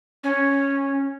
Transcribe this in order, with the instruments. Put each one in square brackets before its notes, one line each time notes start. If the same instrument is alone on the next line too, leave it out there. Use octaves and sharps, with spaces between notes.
[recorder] C#4